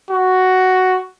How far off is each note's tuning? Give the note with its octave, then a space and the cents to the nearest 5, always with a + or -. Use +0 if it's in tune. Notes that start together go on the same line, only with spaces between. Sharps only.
F#4 +5